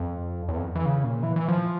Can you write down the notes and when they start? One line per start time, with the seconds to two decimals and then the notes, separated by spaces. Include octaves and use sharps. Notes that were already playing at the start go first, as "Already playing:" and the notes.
Already playing: F2
0.48 E2
0.57 F2
0.75 E3
0.86 C#3
1.04 A#2
1.23 E3
1.36 E3
1.48 F3